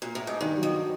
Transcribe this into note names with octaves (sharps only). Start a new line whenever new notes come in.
A#2
A2
G#2
G2 D#3
F#3
F2